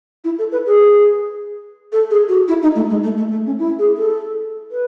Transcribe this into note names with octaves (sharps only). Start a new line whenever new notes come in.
E4
A4
B4
G#4
A4
G#4
F#4
E4
D#4
A3
G#3
A3
A3
A3
C#4
E4
G#4
A4
B4